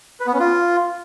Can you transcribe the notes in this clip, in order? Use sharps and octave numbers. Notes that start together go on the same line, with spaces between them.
B4
B3
C#4
F4